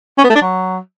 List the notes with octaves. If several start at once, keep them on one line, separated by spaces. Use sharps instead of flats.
C#4
B3
A3
D4
F#3